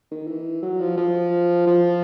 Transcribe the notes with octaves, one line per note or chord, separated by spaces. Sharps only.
D#3
E3
F#3
F3
F3
F3